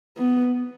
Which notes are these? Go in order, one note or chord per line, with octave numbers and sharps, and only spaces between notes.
B3